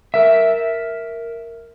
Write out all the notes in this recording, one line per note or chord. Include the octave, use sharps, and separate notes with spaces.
A#4 E5